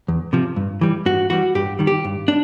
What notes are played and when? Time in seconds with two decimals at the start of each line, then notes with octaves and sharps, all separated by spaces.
0.08 E2
0.33 C3 F3
0.56 G2
0.81 E3 G3
1.06 G2 F#4
1.30 E3 G3 F#4
1.55 G2 G4
1.79 D#3 G3
1.87 G4
2.05 G2
2.28 D4